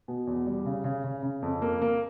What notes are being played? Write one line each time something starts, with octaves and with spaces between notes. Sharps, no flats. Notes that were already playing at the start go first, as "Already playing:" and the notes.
B2
E2
G3
C#3
C#3
C#3
C#3
F2
A#3
A#3